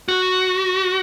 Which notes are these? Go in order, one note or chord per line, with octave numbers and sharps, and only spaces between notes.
F#4